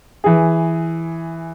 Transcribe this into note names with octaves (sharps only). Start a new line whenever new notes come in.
E3 G#4